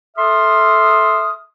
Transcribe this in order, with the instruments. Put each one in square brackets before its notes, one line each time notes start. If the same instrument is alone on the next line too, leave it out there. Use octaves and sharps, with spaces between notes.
[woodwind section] A4 E5 C6 D#6 F6